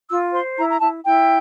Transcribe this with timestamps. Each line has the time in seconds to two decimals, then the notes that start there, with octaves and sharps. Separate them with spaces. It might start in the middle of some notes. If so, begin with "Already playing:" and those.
0.09 F4 E6
0.33 C5 C6
0.57 E4 A#5
0.70 A#5
0.81 E4 A5
1.04 E4 G5